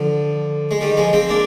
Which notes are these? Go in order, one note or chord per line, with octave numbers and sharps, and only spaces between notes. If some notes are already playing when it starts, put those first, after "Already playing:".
Already playing: D3 F3
G#3
D#3 G3
F3 G#3
G#3 C4
A#3 D4